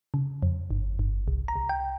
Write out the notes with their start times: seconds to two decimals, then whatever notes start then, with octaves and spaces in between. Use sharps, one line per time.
0.14 C#3
0.43 F2
0.71 G1
0.99 G1
1.28 C2
1.48 A#5
1.56 C2
1.69 G5